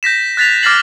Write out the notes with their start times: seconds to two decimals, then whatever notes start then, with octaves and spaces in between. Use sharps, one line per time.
0.03 G6 A#6 B6 E7
0.37 F#6 A6 B6 F7
0.63 D6 F6 A6 A#6 C7 F#7